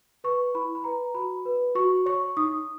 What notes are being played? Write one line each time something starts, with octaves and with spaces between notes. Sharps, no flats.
B4 C#6
E4 B5
B5
B4 A#5
F#4 B5
B4
F#4 C#6
C#5 C#6
D#4 D#6